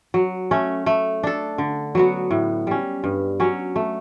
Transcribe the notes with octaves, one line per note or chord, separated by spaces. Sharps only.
F#3
A3 C#4
A3
D4 A4
D3
F#3 B3 F#4
A2
G3 C#4
G2
F#3 C#4
A3